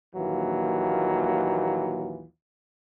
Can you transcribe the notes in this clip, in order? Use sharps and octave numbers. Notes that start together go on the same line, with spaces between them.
A#1 D#2 E3 F#3 F4